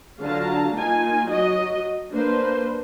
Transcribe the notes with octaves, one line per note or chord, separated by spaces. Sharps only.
D3 F#3 F4 F5 A5 A#5
A#3 D#4 F4 G#5
F#3 F#4 D#5
A#3 D4 B4 C5